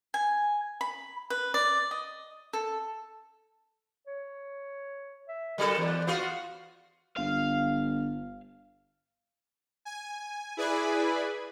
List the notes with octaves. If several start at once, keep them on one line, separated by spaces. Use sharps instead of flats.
G#5
B5
B4
D5
D#5
A4
C#5
E5
F#3 G3 A4 A#4
E2 D5
B3 F4 F#4 F5
G1 F5
G#5
E4 G#4 B4 D5 G#5 B5